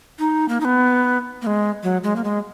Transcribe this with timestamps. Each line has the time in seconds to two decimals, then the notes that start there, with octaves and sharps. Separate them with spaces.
0.19 D#4
0.49 A#3
0.61 D#4
0.65 B3
1.42 A#3
1.47 G#3
1.83 F#3
2.04 G#3
2.16 A#3
2.24 G#3